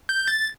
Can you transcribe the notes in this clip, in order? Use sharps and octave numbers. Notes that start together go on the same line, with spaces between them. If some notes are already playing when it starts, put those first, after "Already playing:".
G6
A6